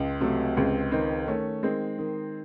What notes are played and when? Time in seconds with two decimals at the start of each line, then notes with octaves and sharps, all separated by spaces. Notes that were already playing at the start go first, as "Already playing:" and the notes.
Already playing: C#2
0.21 C3 F#3 A3
0.56 C#2 G#3 C4
0.92 D#3 C4 D#4
1.27 D#3 A3 C#4
1.63 D#3 G#3 C4
1.98 D#3